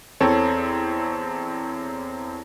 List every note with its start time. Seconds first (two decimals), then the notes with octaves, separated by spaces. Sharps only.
0.20 E2 C4 A4 C#5